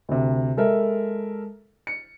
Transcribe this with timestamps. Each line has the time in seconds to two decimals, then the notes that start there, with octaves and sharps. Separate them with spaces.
0.09 D2 C3
0.57 G#3 A4 A#4 E5
1.87 C#7